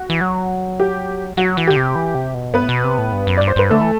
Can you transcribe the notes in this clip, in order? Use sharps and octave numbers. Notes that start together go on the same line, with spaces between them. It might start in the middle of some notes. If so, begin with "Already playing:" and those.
Already playing: F#4
E3
F#3
G4
F#3 F#4
E3
D3 G4
C3
E3
C3
B2
G2 B3 B4
A2
B2
C3
A2
G2
F#2
G2 D5
C5
G2 B4
D3 A3 A4
E3